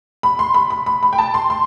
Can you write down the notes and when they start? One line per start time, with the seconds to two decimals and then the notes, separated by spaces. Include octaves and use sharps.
0.23 B5
0.39 C6
0.54 B5
0.70 B5
0.86 B5
1.03 B5
1.13 G5
1.18 A5
1.34 C6
1.50 C6